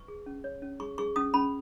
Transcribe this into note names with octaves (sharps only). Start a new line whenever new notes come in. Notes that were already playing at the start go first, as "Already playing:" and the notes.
Already playing: B4 C#6
G#4
C#4
C#5
C#4
G#4 C#6
G#4 C#6
C#4 D#6
C#4 B5